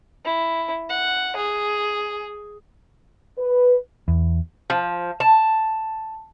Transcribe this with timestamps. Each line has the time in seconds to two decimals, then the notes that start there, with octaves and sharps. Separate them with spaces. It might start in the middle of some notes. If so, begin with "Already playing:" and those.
0.25 E4
0.89 F#5
1.36 G#4
3.39 B4
4.08 E2
4.70 F3
5.20 A5